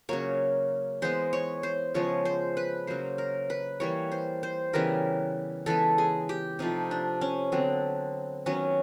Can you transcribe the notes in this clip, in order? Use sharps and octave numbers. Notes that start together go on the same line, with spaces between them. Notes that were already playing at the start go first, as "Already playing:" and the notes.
C#3 F#3 A#3 C#5
E3 G#3 B3 C5
C#5
C5
C#3 F3 G#3 B3 C#5
C5
B4
C#3 F#3 A#3 C5
A#4
B4
E3 G3 A#3 C#5
C5
C5
C#3 E3 G3 B3 A#4
C#3 E3 G#3 B3 A4
G#4
G4
C3 F3 A3 D#4
D4
C#4
D3 F#3 B3 C4
D#3 F#3 B3 C#4